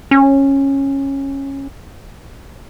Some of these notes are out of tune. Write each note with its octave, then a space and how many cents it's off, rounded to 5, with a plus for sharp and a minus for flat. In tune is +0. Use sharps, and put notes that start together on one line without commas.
C#4 -15